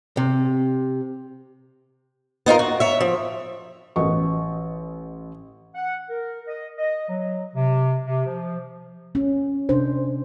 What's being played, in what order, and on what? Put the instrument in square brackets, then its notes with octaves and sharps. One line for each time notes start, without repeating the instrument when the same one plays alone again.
[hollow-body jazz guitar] C3
[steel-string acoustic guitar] B3 D#4 F4 A#4
F#4
C#5 E5
F3
[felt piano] A1 D#5 C#6
[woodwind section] F#5
A#4
D#5
D#5
F#3
C3
C3
F3
[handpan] C#4
C3 D4 C5